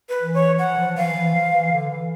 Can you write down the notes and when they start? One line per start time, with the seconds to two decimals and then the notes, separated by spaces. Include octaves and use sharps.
0.09 B4
0.22 E3
0.34 C#5
0.59 E3 F#5
0.77 F3
0.97 E3 F5
1.16 E3
1.34 F3
1.53 E3
1.71 D3
1.89 E3